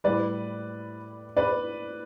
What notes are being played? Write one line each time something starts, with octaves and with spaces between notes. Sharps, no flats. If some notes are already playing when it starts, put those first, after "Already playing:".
A2 G3 B4 D5
B4 D5